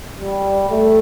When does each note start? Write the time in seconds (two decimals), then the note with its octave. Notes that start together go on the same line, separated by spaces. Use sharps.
0.20 G3
0.69 A3